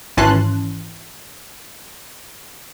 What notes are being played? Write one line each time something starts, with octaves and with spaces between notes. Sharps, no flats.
G#1 E3 C#4 A5 C6 F#6